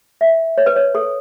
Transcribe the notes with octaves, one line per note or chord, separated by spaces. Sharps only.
E5
C#5
B4
C#5
A4